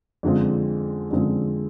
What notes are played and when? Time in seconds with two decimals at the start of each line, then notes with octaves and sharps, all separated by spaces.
0.23 F2 D3 G#3 C4 F4
1.11 F2 D3 G#3 C4 F4